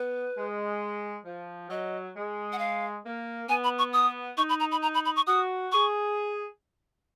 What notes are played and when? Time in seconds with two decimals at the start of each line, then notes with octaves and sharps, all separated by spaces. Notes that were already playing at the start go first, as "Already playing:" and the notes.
Already playing: B3 B4
0.36 G#3
1.25 F3
1.69 F#3 D#5
2.15 G#3
2.53 F#5
2.59 F5
3.04 A#3
3.49 B3 G#5
3.64 B5
3.78 C#6
3.93 D#6
4.37 D#4 C#6
4.49 B5
4.60 A#5
4.72 B5
4.82 A#5
4.94 B5
5.05 B5
5.16 C#6
5.27 F#4 D#6
5.72 G#4 C#6